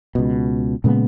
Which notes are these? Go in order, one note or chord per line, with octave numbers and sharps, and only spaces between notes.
C#2 B2
A#2 C#3 G#3 B3